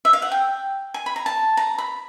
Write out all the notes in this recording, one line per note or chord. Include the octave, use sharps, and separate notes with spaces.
E5
F5
F#5
G5
G#5
B5
A#5
A5
A#5
B5